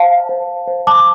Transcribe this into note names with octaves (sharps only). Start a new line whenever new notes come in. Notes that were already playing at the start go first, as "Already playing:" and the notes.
Already playing: C5 F5 A5
C5
C5
A5 D6